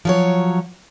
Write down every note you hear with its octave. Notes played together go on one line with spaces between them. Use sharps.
F3 F#3 C#5